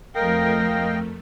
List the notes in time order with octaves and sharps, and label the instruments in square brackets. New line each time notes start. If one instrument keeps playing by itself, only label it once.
[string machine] F2 A3 [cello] F3 A#4 [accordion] D#5 F5 G5